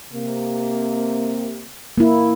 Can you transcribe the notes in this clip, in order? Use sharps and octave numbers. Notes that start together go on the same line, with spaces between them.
C3 A#3
A#3 E4